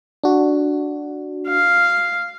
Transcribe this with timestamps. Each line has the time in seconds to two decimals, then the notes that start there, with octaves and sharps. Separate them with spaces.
0.23 D4 F#4
1.48 F5